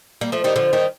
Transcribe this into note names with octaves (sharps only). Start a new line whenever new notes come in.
G3 A#3
F3 A3
D#3 G3
D3 F3
D#3 G3